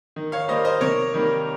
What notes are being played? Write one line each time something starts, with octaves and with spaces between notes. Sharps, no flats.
D#3
C#5 F5
G3 A#3 C5 D#5
C5 D#5
C3 A#4 C#5
D#3 G3 A#3